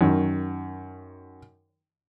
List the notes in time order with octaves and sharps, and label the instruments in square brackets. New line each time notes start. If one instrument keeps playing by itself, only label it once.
[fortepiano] F#2 D#3